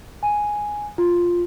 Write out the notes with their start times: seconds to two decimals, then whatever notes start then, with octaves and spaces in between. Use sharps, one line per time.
0.23 G#5
0.98 F4